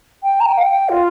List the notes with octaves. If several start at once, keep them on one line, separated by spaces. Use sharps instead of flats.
G5
A#5
G5
F5
G5
F4